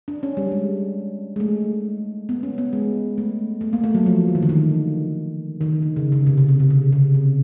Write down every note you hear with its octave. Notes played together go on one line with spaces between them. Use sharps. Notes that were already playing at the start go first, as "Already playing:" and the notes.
D4
C#4
G3
G#3
G#3
A3
B3
C#4
B3
G#3
A3
A3
A#3
A3
F#3
F3
E3
D#3
D3
D#3
D#3
D3
C#3
C#3
C3
C#3
D3
C#3
C3
C#3
C3